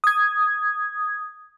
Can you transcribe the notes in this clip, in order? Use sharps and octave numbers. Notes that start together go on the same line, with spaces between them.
D#6 G#6